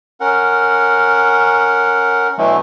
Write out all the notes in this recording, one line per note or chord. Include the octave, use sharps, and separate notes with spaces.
C#4 A#4 F#5
B2 D3 E3 F#3 A3